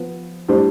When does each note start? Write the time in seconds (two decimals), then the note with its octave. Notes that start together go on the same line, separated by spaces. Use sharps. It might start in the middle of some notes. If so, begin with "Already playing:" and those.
Already playing: F3 B3
0.48 A2 G3 D4 G4 C5